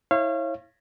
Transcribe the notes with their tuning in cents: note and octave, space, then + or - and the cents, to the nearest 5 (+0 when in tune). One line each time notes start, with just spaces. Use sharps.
E4 -20 C#5 -30 F5 -30